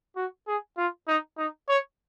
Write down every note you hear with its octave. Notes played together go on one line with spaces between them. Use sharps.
F#4
G#4
F4
D#4
D#4
C#5